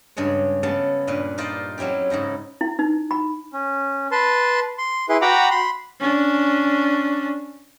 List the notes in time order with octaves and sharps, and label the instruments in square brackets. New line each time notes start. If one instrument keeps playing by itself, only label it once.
[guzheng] G2 C#3 G#3 C#5
C#3 B3 C#4 A4 A5
G2 A#2 B4
D#4 F4 C5 D5
F#3 C4 C#4 E4 G4
G#2 C#3 D#4 E4
[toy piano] E4
D#4
B5
[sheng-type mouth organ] C#4
B4 A5 C6
C6
E4 G#4 B4 C6
F#4 F#5 G5 A#5 B5 D6
B5 C6
[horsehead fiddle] C#4 D4